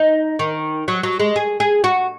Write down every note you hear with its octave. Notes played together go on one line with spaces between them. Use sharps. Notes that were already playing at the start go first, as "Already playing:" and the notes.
Already playing: D#4
D#3
F#3
F#3
G#3
G#4
G#4
F#4